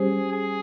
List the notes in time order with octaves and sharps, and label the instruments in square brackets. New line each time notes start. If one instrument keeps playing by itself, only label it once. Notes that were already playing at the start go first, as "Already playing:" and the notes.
Already playing: [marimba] G3 C#4 G4 C5 [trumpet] G#4
[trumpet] G#4